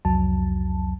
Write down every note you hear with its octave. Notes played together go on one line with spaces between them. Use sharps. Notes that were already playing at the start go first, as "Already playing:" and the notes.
C2 F2 F#3 A5